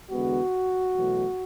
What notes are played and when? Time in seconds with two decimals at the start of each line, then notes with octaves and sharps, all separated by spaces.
0.11 E2 D3 G#3 B3 F#4
0.95 E2 B2 F#3 A3